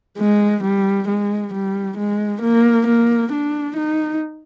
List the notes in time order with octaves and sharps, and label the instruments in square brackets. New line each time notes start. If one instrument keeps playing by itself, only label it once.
[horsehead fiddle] G#3
G3
G#3
G3
G#3
A#3
A#3
D4
D#4